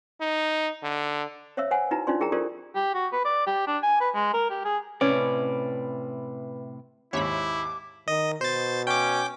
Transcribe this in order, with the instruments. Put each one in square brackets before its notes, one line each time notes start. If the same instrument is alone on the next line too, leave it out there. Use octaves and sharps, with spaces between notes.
[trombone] D#4
D3
[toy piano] C5 C#5 E5 F5 E6
B4 C5 F#5 G#5
D#4 E4 F#4 B4 A#5
D4 D#4 F4 C5 D5 C6
E4 G#4 A#4 G5 A#5
F4 G4 A4 A#4 C5 D5
[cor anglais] G4
F#4
B4
D5
G4
D4
G#5
B4
G#3
A#4
G4
G#4
[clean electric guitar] A2 C3 D5 [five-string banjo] C#4 [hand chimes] B4
[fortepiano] D#2 G#2 [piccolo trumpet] E4 [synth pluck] C#5 E5 B5 [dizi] D6
[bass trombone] D#3 [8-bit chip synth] D#5
[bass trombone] B2 [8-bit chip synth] C5 A6
[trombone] C#4 [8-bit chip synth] G5 D6